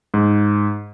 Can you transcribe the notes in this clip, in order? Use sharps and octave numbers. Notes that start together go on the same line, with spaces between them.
G#2